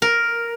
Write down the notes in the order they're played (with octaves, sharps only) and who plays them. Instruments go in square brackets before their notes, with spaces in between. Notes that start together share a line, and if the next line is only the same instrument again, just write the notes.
[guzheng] A#4